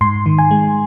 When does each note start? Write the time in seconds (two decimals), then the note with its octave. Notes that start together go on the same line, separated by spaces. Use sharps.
0.01 G#2 C6
0.26 D#3
0.38 G#5
0.51 G#3